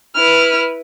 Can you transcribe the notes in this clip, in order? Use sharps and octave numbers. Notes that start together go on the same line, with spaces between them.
E4 B4 F6